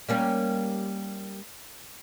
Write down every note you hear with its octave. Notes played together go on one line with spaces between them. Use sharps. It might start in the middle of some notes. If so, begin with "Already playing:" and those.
G3 A#3 C#4